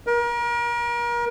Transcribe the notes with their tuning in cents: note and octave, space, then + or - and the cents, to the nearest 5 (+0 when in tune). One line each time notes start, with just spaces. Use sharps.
A#4 +35